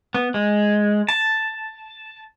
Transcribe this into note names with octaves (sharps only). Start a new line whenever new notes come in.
B3
G#3
A5